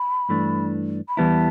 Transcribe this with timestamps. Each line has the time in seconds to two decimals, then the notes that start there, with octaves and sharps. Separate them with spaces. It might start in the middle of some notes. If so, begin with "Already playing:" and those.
Already playing: B5
0.29 G2 E3 A3 D4
1.08 B5
1.17 E2 E3 G3 B3 E4 A5